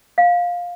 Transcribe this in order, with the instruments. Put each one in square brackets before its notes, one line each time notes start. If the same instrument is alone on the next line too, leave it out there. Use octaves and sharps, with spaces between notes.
[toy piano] F5